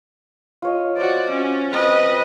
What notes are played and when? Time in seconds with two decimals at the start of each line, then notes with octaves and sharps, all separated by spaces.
0.62 F4 C#5 D#5
0.97 F#4 C5 D5
1.30 C#4
1.73 C4 B4 D#5